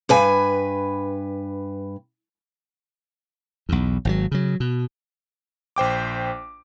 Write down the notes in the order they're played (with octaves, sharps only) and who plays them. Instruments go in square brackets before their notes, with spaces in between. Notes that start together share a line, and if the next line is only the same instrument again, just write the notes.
[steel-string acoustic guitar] G2 B4 G#5
[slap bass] B1 E2
G#1 B2 F#3
C#3 F#3
B2
[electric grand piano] A#1 C5 G5 D6